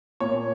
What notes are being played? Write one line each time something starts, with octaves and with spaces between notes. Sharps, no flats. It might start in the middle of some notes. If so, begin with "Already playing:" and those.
A#2 C#5